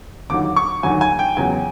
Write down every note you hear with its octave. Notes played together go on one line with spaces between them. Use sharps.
D#2 D3 F#3 D6
C#6
D#2 D3 F#3 G#5
G#5
G5
E2 C#3 F#3 G#5